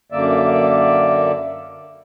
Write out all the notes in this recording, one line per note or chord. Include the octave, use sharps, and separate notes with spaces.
F#2 D3 A#3 D5 E5